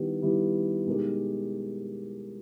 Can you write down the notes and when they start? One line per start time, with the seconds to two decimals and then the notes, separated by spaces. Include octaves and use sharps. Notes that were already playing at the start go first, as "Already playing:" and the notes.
Already playing: D#3 G3 B3 E4 G4
0.22 D#3 G3 B3 E4 G4
0.86 B2 G#3 D#4 G4 A#4